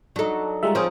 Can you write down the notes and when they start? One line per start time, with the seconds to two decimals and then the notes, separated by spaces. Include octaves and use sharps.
0.16 F#3 D4 D#4 A4
0.63 G3 G#3 F4 E5 F#5 A#5
0.75 F3 C4 G#4 C#5 A#5 D#6